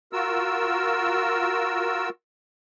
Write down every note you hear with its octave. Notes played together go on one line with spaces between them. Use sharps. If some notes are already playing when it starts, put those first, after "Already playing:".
F4 F#4 A#4 E6